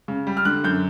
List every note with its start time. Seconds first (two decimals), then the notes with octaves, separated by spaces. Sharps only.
0.08 C#3
0.27 G3
0.37 F6
0.45 D3 F#6
0.64 F#2 G6